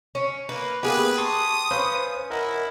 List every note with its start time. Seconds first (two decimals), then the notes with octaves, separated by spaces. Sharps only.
0.15 C#4
0.49 A#3 B4
0.83 A#3 B3 G4 G#4 B4
1.18 A5 C6 C#6 D#6
1.71 C#4 B4 C5 F5
2.30 E4 A#4 D#5 F#5